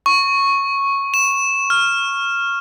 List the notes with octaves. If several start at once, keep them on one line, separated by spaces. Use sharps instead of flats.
C#6
E7
F6